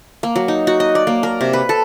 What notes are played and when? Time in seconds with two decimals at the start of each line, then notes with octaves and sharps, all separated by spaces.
0.23 A#3
0.36 F#3
0.48 D#4
0.67 F#4
0.80 D#5
0.95 D5
1.07 A#3
1.23 A#4
1.41 C3
1.53 B4
1.69 A4